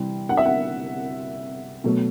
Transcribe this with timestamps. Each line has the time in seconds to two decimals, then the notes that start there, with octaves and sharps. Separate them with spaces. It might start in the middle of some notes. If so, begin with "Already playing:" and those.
Already playing: C3 E3 G3 C4
0.29 F#5
0.37 E5
0.45 F#5
1.84 B2 F#3 A3